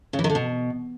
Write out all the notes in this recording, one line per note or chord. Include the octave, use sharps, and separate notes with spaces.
C#3
E3
D#3
D3
B2